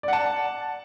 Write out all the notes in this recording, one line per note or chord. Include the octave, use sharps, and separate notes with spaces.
D5 F#5 A5